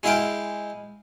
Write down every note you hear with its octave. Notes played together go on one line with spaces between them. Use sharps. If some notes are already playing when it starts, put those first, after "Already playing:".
G#3 E4 F5 G5